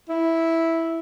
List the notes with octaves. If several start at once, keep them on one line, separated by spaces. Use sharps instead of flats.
E4